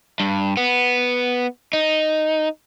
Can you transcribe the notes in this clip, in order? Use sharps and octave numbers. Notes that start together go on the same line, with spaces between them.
G2
B3
D#4